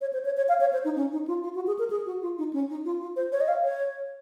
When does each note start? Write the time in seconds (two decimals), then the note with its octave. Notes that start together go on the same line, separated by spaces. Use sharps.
0.01 C#5
0.13 C5
0.25 C#5
0.37 C#5
0.49 F5
0.60 C#5
0.73 C5
0.85 D#4
0.96 C#4
1.12 D#4
1.27 F4
1.43 F4
1.55 F#4
1.67 G#4
1.79 A#4
1.90 G#4
2.06 F#4
2.22 F4
2.38 D#4
2.53 C#4
2.70 D#4
2.85 F4
3.01 F4
3.16 C5
3.32 C#5
3.41 D#5
3.48 F5
3.64 C#5